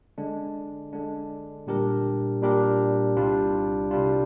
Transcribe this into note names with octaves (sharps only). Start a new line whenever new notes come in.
D3 G#3 D4
D3 G#3 D4
A#2 G3 D4 G4 A#4
A#2 G3 D4 G4 A#4
C2 C3 G3 D4 F4
C2 C3 G3 D4 F4